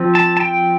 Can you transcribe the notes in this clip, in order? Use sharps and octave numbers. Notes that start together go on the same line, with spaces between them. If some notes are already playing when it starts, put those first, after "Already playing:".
Already playing: F3 C4
A5
A5
G5